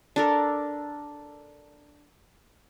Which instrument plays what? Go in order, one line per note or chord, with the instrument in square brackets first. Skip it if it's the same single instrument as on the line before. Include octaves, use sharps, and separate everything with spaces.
[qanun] D4 A4 A#4